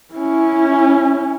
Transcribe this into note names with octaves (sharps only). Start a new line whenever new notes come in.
C#4 E4